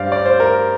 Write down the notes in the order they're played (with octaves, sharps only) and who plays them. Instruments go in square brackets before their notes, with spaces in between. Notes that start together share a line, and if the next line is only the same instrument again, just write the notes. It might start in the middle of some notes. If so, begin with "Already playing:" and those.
Already playing: [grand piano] G2 G3 C5 D5 F5
D5
C5
A#4